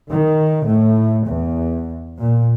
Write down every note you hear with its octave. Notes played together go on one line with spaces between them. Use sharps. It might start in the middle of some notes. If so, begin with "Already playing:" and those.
D#3
A2
E2
A#2